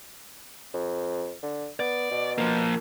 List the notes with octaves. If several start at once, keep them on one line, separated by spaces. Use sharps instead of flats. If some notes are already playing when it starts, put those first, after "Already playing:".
F2
D3
B3 D5
B2
F3 A#3